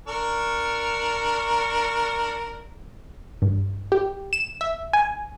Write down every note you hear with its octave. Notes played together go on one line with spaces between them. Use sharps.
D4 A#4 C#6
G2
G4
E7
E5
G#5